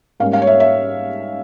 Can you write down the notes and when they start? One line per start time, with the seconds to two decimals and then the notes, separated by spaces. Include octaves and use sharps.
0.20 G#2 G3 A#3 C#4 F5
0.33 F5
0.42 C#5
0.47 E5
0.60 E5